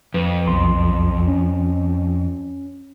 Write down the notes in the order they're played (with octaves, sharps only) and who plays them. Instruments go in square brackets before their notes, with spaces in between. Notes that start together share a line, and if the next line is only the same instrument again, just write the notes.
[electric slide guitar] F2 [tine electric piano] B4
[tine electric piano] B1 E2 C6
C#4